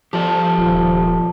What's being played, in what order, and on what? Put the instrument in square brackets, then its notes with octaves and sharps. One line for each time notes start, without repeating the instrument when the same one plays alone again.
[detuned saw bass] F3 [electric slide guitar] G4 A4 D5 [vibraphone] A5
[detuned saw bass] D#1 [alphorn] F3